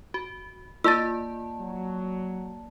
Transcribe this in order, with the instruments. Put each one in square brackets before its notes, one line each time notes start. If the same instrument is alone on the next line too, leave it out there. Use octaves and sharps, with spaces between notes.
[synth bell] F#4
[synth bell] A#3 D5 A5 [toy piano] F4 [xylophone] E6 A6
[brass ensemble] F#3